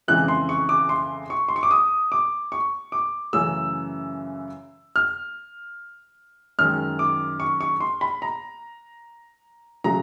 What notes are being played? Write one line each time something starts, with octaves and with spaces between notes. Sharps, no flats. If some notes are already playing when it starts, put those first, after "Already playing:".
F2 C#3 E3 G#3 F#6
C6
C#6
D6
C6
C#6
C6
C#6
D6
D#6
D6
C#6
D6
F#2 C#3 E3 A3 E6
F6
F#2 D#3 G#3 F6
D6
C#6
C#6
C6
B5
A#5
C#3 F#3 A3 A#5